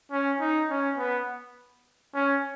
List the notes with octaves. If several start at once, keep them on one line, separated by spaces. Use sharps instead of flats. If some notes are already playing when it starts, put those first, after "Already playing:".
C#4
D#4
C#4
B3
C#4